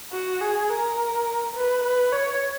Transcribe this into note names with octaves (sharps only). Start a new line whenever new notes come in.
F#4
G#4
A#4
B4
B4
C#5